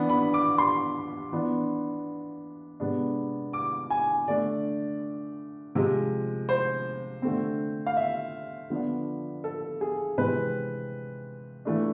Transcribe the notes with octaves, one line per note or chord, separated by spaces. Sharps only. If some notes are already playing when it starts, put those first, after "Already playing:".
Already playing: E3 B3 D4
B5
D6
C6
E3 B3 D4
C3 G#3 B3 D4
D6
G#5
D3 A3 D4 D5
C3 F3 G#3
C5
D3 A3 C4
F5
E5
D3 F3 B3 D4
A4
G#4
C3 E3 G#3 C4 B4
E3 A3 D4